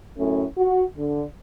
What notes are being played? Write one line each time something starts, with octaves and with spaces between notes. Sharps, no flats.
F#2 A2 A3 C#4
F#4
D3